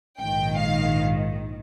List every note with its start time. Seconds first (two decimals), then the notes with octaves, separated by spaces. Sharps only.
0.19 A#1 G#2 D#3 G5
0.58 F5